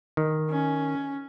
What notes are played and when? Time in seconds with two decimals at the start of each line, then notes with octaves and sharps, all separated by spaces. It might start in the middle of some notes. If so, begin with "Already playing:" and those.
0.17 D#3
0.50 C#4